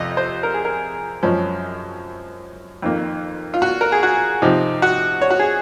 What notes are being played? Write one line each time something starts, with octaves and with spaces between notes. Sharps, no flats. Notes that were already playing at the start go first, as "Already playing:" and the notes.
Already playing: F2 C3 D#5
C5
A#4
G#4
A#4
F#2 F3 G#3 C#4
F2 D#3 A#3
F4
F#4
A#4
G#4
F#4
C3 F3 C4 D#4
F#4
C#5
F#4
G#4